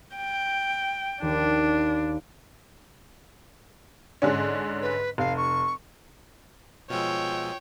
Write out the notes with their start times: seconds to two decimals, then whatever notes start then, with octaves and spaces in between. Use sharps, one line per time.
0.16 G5
1.22 D#2 D4
4.22 G#2 D3 C#4
4.82 B4
5.18 F1 F5
5.36 C#6
6.90 B2 F3 G#3 F4 C#5 G5 E6